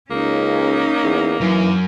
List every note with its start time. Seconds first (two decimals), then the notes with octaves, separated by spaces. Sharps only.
0.11 C#2 A#3 C#4 D#4
1.04 E2
1.41 F#2 E3